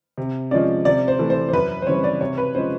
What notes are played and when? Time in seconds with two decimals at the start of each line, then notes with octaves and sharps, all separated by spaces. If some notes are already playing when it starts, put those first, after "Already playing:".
0.18 C3
0.51 F3 G#3 C#4 D5
0.85 C3 D5
1.08 C5
1.19 E3 A3
1.30 C5
1.49 C5
1.53 F#2 B4
1.82 C5
1.87 C#3 E3 G3 C4 C#5
2.04 D5
2.20 C3 C#5
2.38 B4
2.55 F3 G#3 C#4 C5